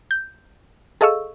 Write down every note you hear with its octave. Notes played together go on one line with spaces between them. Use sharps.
G6
G#4 A4 D#5 F5 C#6 E6